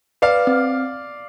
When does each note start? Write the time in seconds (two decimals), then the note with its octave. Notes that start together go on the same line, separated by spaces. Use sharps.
0.22 B4 D5 F5
0.47 C4